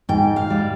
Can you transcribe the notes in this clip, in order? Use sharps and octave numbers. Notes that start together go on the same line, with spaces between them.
G#2 G5
F5
G3